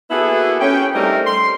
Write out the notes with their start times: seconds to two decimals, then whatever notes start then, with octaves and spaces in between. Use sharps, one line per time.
0.11 A#3 B3 E4 F#4 G#4 A4
0.61 C#4 G4 G5
0.94 G3 A3 C4 D#4 A#4
1.27 C6